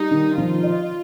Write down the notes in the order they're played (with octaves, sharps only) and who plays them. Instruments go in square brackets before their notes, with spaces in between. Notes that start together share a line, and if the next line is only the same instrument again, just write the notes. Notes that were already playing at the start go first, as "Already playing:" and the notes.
Already playing: [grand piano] G3 [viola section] D#4
[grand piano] D#3
[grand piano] F3 [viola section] F4
[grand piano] D#5